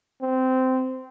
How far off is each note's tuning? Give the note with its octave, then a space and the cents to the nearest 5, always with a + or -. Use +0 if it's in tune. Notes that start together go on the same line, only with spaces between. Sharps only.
C4 -15